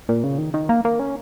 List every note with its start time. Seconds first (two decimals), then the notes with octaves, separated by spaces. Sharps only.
0.09 A#2
0.24 C#3
0.38 D#3
0.54 D#3
0.69 A#3
0.85 A#3
1.00 C#4